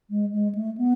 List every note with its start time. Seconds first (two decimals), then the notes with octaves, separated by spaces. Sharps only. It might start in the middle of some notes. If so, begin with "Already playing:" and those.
0.10 G#3
0.33 G#3
0.55 A3
0.77 B3